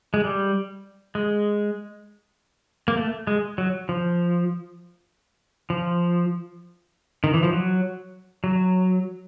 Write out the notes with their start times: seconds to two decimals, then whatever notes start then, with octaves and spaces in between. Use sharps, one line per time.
0.14 G#3
0.24 G3
1.15 G#3
2.88 A#3
2.97 A3
3.27 G#3
3.58 F#3
3.89 F3
5.70 F3
7.24 D#3
7.34 E3
7.43 F3
7.53 F#3
8.44 F#3